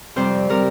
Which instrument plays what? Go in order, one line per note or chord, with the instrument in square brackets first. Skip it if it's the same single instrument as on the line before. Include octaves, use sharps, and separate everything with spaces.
[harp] F2 C3 G3 C5
C3 G3 A#4